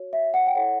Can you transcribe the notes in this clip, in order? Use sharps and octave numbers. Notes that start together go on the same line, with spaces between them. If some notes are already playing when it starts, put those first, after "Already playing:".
Already playing: F#4 C#5
E5
F#5
G5
E4 A4 C#5 F#5